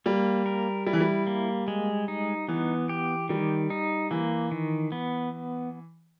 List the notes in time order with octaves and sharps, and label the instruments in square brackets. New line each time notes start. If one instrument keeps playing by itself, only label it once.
[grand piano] G3 [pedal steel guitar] A#3
[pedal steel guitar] A#4
[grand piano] G3 [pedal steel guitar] E4
[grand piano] E3
G3
[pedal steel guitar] A#3
G#3
D#4
[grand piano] E3 [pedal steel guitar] B3
[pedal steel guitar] G4
[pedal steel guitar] D#3 [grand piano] G3
[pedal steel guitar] D#4
[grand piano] E3 [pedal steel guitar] A#3
[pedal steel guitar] D#3
B3